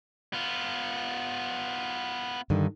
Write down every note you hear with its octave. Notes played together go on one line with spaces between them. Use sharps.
B3 F4
G2 D3 D#3